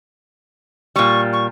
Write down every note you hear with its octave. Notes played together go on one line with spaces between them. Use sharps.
A#2 G3 C#6
C#6